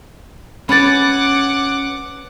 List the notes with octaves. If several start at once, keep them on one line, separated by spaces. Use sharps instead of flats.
C#4 B4 F#5 B5 D6 A6